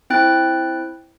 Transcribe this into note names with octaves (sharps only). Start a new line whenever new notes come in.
C4 E4 G5 F#6 A6